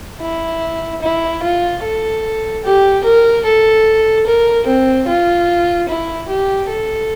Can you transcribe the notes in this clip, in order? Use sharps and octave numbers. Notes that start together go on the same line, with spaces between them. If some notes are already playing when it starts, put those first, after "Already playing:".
E4
E4
F4
A4
G4
A#4
A4
A#4
C4
F4
E4
G4
A4